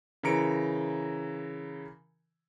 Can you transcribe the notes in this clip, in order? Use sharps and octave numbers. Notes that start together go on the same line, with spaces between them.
C#3 E3 A#4 A#5 C#7 D7